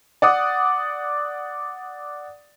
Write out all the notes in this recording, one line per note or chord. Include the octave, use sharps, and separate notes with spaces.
D5 F#5 D#6